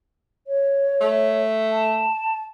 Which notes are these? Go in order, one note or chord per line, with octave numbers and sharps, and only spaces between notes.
C#5
A3
A5